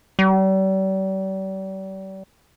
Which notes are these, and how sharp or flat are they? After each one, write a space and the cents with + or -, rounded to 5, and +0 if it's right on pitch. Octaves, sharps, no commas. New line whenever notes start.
G3 -40